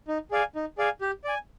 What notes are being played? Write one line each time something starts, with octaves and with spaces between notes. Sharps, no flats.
D#4
G#4 D5 F5 G#5
D#4
G#4 D5 F5 G#5
G4
D5 G#5